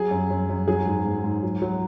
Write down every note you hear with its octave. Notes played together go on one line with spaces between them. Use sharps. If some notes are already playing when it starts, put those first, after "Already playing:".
Already playing: F#3 G#4
F#2
F#2
F#2
F#3 G#4
G#2
G#2
G#2
F#3
F#3